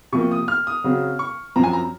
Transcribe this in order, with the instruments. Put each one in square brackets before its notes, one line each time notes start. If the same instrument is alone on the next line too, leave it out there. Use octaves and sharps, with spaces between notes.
[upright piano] C3 F3 A#3 C#6
D#6
F6
D#6
C#3 F#3 C4
C#6
F#2 F3 C4 A#5
G#5
A#5